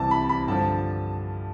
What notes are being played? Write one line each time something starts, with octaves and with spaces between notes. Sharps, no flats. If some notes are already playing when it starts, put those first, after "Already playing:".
Already playing: C2 C3 E3 A5
B5
B5
G2 D3 F3 A5